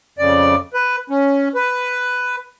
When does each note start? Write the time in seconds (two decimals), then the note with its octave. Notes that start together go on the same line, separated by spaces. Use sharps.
0.19 F2 C#3 D5
0.74 B4
1.10 C#4
1.55 B4